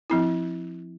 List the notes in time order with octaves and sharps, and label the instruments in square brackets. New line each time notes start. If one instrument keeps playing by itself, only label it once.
[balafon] F3 C4 E4